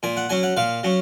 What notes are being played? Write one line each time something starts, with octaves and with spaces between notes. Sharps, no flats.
A#2 G#5
F#5
F#3 C#4 G#5
F#5
A#2 F5
F#3 C#4